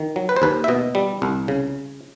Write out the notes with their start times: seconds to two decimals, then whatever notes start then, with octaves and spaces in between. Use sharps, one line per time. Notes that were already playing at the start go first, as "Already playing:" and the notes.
Already playing: D#3
0.16 F#3
0.29 B4
0.36 C5
0.42 D#2 B4
0.64 E5
0.68 B2 D#5
0.95 G3
1.22 C2
1.48 C#3